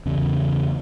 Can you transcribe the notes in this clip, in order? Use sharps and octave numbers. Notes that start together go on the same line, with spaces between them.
E2 C#3